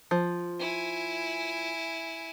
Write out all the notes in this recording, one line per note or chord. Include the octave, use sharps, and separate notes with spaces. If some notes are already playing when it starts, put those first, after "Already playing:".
F3
E4 G#5